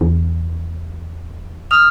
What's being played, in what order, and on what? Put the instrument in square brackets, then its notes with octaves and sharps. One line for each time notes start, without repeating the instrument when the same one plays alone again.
[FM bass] E2
[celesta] D#6 F6 F7